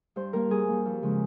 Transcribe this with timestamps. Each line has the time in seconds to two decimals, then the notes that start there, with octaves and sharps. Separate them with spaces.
0.16 G2 C5
0.33 G3 A#3 A#4
0.50 G2 G#4
0.68 G3 A#3
0.85 F2
1.03 C#3 F3 G#3